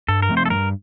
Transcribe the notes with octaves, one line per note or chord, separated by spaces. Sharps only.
G2 A4
A#4
F3 A3 C4
C5
A4
G2 A#4